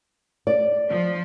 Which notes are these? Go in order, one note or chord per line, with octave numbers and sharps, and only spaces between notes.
D5
F3